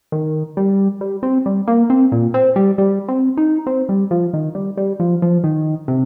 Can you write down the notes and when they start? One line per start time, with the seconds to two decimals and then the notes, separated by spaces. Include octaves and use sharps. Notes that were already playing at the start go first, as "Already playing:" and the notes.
0.12 D#3
0.57 G3
1.01 G3
1.23 C4
1.46 G3
1.68 A#3
1.90 C4
2.12 A#2
2.34 C4
2.56 G3
2.78 G3
3.08 C4
3.37 D#4
3.67 C4
3.89 G3
4.11 F3
4.34 D#3
4.55 G3
4.77 G3
5.00 F3
5.22 F3
5.44 D#3
5.88 C3